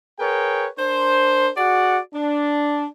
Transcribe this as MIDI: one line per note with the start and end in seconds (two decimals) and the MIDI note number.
0.19 0.67 68
0.19 0.67 70
0.19 0.67 71
0.19 0.67 73
0.19 0.67 79
0.78 1.50 62
0.78 1.50 70
0.78 1.50 72
1.56 1.99 66
1.56 1.99 68
1.56 1.99 74
1.56 1.99 78
2.14 2.86 62